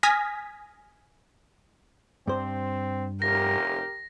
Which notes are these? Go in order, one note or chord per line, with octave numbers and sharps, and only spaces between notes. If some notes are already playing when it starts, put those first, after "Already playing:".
G#5 D#6 F6 G#6 A#6 B6
G2 C4 C5
F1 G4 A#4 A#6